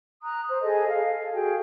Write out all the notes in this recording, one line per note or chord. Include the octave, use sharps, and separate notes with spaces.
A#5 D#6 F#6
C5
G#4 A4 D#5
F5
A4
F#4 G#4 G5